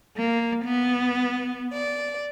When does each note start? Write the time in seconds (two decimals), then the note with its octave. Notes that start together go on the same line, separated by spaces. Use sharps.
0.17 A#3
0.63 B3
1.72 D5